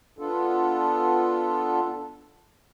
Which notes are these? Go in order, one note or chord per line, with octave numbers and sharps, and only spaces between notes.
B3 D4 F4 A4